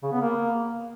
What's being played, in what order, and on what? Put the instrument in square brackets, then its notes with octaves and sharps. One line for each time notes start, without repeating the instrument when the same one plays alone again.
[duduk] C#3
B3
A#3